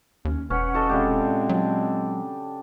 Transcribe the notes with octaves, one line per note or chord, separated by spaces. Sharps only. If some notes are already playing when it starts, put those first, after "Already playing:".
D#2 C#4
E1 C#4 B4 F#5
F#4 A4 D#5
A#2 C#3 G#3 C4 D4 G4
F#3